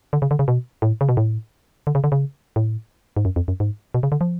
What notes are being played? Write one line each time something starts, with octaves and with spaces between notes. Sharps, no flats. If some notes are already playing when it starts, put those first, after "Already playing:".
D3
C#3
D3
C#3
B2
A2
C#3
B2
A2
D3
C#3
D3
C#3
A2
G#2
F#2
F2
F#2
G#2
B2
C#3
D3
F3